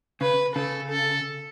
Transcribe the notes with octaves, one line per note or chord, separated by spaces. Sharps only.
C#3 B4
C#3 A4
A4